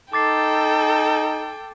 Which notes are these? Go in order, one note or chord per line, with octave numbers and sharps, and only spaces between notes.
D#4 A4 G5 D6 A6 C7